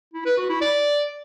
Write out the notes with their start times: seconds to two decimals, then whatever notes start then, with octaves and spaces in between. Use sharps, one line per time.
0.14 E4
0.26 B4
0.37 F#4
0.49 E4
0.61 D5